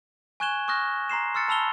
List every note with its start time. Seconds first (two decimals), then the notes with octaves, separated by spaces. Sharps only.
0.40 G#5 C#6 F#6 G#6 E7 G7
0.68 C#6 D#6 F6 F#6 A#6
1.09 A#5 C6 C7 E7
1.35 C6 E6 F6 A6 C#7
1.48 A5 B5 E6 F7 G7